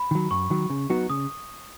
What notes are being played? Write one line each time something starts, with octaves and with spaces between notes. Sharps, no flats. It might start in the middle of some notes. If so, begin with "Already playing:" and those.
Already playing: B5
D#3 F#3
F#2 C#6
D#3 F#3
C#3
F#3 B3 D#4 F#4
C#3 D#6